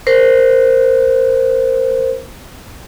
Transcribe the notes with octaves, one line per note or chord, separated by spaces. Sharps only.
A#4 C5